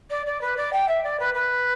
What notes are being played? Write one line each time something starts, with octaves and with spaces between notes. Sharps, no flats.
D5
D5
B4
D5
G5
E5
D5
B4
B4